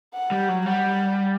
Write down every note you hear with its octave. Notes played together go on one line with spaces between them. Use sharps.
F#5
G3
F#3
G3 F#5